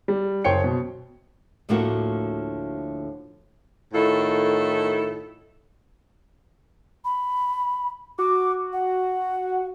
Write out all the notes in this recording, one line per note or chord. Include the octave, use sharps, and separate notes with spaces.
G3
F#1 C5 C#5 G5 C#7
B2
D2 A2 D3 F3 A#3 F#4
A2 D#3 E4 F4 A4
B5
F#4 D6
F#5